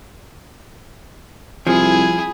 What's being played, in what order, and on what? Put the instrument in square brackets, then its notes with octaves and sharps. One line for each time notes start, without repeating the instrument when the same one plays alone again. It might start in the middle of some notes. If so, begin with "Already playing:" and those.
[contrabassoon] C2 [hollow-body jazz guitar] F3 [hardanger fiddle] E4 G#4